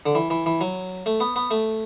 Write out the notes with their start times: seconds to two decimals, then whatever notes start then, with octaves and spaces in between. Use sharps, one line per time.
0.06 D3
0.15 E3
0.30 E3
0.46 E3
0.61 F#3
1.06 A3
1.20 B3
1.36 B3
1.51 A3